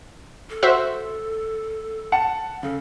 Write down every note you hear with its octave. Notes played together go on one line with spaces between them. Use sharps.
A4
F#4 C5 E5
F#5 A5 C#7
C#3 A4